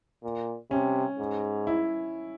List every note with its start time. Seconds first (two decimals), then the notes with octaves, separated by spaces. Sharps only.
0.23 A#2
0.71 C3 C#4
1.19 G#2
1.67 E4